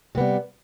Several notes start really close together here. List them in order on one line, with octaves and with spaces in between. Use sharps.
C3 B3 G3